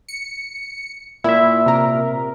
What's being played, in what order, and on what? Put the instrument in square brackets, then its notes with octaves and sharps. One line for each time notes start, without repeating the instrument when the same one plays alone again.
[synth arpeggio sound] C#7
[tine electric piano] A#2 E5 [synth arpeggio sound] E4
[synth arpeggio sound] C3 A#4